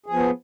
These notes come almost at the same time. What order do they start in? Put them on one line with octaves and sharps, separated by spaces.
G#4 F3 B3